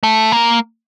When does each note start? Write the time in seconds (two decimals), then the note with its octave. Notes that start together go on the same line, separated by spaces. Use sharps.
0.03 A3
0.32 A#3